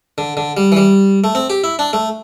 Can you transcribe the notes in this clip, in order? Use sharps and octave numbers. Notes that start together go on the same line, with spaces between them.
D3
D3
G3
E3
G3
A3
C4
G4
E4
D4
A3